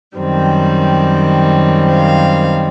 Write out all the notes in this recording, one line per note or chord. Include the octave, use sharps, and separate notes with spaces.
F#2 D#3 G3 C4
F5